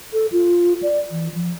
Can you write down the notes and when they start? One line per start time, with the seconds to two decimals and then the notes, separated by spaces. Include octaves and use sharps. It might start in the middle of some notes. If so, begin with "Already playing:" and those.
0.13 A4
0.32 F4
0.83 D5
1.11 E3
1.34 F3